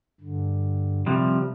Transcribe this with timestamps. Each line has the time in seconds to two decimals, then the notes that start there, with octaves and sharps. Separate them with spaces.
0.21 G2 D3
1.06 C3 F3 G3